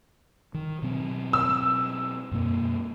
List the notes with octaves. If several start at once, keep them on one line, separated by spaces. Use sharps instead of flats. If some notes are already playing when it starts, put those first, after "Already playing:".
D#3
B2 F#3 C4
E6
F#2 B2 A#3